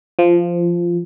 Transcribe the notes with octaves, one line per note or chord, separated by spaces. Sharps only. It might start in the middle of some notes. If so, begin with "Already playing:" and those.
F3